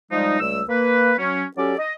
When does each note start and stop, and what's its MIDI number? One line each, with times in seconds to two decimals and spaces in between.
0.11 0.38 53
0.11 0.38 55
0.11 0.38 56
0.11 0.38 63
0.40 0.61 37
0.40 0.61 55
0.40 0.61 57
0.40 0.61 88
0.69 1.13 58
0.69 1.13 71
1.18 1.44 54
1.18 1.44 61
1.56 1.75 54
1.56 1.75 61
1.56 1.75 67
1.56 1.75 69
1.56 1.75 74
1.78 1.94 75